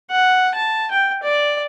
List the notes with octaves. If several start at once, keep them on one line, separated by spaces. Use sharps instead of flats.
F#5
A5
G5
D5